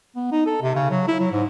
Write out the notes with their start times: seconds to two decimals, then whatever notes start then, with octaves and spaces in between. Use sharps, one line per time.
0.16 B3
0.32 D#4
0.46 A4
0.62 C3
0.76 C#3
0.90 F#3
1.08 E4
1.20 F#3
1.32 G#2